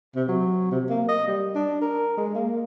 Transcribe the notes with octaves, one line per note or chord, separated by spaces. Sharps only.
C3
F#3
C3
A#3
D#5
G3
D4
A#4
G#3
A#3